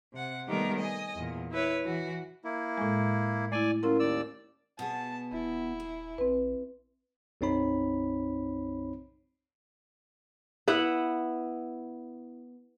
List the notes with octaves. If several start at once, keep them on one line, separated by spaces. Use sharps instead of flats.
C3 F#5
D#3 G3 A3 B3 G4 A#4
D#5 G#5
E2 A#2
E4 B4 C#5
E3 F#4
A#3 E4
A2 G#3
A3 E4 D5 G#5
F#3 C#4 E4 F4 A#4
D#2 D5 E6
B2 B3 G#4 A5
D#1 E4
G#4
A#1 C4 B4
B1 F#2 C4 D#4 C#5 B5
B3 E4 E5 F#5